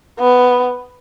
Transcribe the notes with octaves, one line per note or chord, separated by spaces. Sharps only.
B3